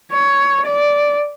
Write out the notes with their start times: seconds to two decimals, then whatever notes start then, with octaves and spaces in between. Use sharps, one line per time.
0.12 C#5
0.66 D5